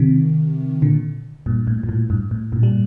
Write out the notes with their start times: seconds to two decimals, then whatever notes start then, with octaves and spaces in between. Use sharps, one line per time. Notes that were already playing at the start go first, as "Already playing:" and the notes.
Already playing: C3 D#3
0.82 A#2 D3
1.46 G2 A#2
1.67 A2
1.83 A#2
1.89 A2
2.10 G2
2.31 A2
2.52 G2 A#2
2.63 G3